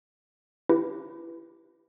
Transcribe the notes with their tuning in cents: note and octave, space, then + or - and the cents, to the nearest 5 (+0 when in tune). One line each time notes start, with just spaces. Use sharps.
E4 +25 G4 +0 B4 +0